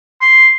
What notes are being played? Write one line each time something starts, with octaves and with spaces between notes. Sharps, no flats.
C6